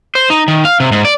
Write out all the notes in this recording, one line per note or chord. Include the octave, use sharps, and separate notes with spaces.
C5
D#4
D#3
F5
C3
G#2
D5